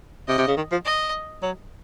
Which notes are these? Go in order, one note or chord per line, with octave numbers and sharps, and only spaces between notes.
C3 D#5
C3
C#3
D#3
F3
D#5
F#3